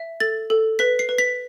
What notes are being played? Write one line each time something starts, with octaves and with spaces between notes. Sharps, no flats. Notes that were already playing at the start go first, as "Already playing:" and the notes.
Already playing: E5
A4 A6
A4
B4 B6
C7
B4
B6